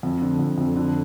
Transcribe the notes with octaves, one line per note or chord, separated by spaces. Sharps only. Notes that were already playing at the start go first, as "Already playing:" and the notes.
F2
D3
F2
F2
D3